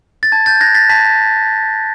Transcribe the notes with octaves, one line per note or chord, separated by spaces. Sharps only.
A6
A5 G#6
G6 A6
F#6 G#6 A#6
A6 B6
A5 B6